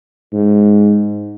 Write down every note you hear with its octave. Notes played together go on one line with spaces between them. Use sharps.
G#2